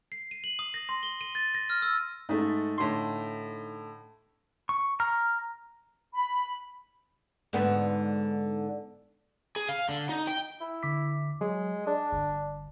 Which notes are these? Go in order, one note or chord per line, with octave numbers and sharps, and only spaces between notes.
C7
D#7
F#7
D#6
A#6
C6
G7
D#7
A6
A#6
F6
E6
G#2 A3 D#4
A2 D3 C6
C#6
A#5 F6
B5
G#2 D3 B3
G#4
F5
D3
D#4
G5
E4
D3 D6 B6
F#3 G#3
D4 G#4
G1